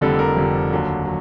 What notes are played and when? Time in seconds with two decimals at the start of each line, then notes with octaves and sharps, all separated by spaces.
0.01 F1 F2 D3 G3 A4
0.19 A#4
0.36 F1 F2 D3 G3
0.70 D#2 D3 F#3
1.05 F#3